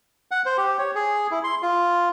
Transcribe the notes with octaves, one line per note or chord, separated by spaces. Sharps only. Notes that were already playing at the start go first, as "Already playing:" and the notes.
F#5
C5
G4
C#5
G#4
E4
C6
F4